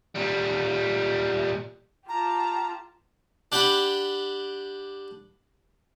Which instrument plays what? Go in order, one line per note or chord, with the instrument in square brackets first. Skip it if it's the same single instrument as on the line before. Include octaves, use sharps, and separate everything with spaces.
[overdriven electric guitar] A#2 G3
[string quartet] F4 G4 A5 [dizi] A#5
[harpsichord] D4 G4 F#5 G5 B5